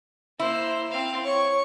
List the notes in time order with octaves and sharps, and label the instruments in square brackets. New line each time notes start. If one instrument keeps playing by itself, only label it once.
[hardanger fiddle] A#3 C5 [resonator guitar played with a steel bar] E4
[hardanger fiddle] C4 F5
[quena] C#5 [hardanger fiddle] C#6